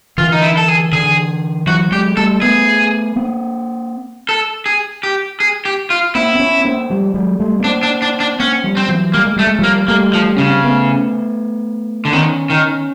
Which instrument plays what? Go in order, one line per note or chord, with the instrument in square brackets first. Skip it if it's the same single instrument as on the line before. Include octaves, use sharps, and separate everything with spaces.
[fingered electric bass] D3 E3 [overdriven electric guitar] F4
[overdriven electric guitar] D#4
E4
A4
G#4
[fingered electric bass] D3 E3 [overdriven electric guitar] G#4
[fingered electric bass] E3 F#3 [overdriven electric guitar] F#4
[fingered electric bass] F#3 G#3 [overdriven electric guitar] G4
[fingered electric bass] G3 A3 [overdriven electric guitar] A4
[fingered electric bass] A3 B3 [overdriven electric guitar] G#4
[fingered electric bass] A#3 C4
[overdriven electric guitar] A4
G#4
G4
G#4
G4
F4
[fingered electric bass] A#3 C4 [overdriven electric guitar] E4
[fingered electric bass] C4
B3 C#4
B3
A#3 C4
F3 G3
F#3 G#3
G3 A3
B3
[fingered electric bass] A#3 C4 [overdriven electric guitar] D4
[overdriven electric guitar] D4
D4
D4
[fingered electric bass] A#3 C4 [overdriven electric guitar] C#4
[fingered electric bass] F3 G3
[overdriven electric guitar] C4
[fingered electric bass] E3 F#3
[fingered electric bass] G3 [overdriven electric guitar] A#3
[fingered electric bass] G#3
[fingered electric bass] G3 [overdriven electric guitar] A3
[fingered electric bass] G#3
[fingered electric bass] F3 G3 [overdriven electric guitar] A#3
[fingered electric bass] G3 A3 [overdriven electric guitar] A#3
[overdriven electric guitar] F3
[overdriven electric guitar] C#3 [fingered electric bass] C#4
[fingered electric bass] C4
A3 B3
[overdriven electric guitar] D3
[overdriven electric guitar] D#3 [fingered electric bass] B3 C#4
[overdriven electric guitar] D#3